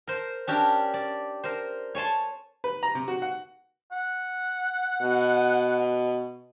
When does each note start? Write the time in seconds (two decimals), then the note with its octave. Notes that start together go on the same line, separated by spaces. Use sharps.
0.08 A#4 C5
0.47 C#4 D4 G4 A#4
0.94 D5
1.44 A#4 C5
1.95 C#5 G#5 A5 C6
2.64 B4
2.83 A#5
2.95 C3
3.08 F#4
3.22 F#5
3.91 F#5
5.02 B2